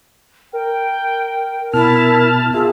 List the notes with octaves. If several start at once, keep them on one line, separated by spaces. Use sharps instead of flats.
A#4 G5
B2 E4 A5 F6
F4 G#4 E5